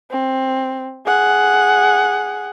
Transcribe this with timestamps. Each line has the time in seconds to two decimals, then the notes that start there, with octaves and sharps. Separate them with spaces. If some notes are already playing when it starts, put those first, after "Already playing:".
0.11 C4
1.06 G#4 F#5